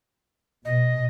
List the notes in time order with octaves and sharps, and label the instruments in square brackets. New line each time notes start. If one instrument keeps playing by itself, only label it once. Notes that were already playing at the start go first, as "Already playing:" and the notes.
[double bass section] B2 [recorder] D#5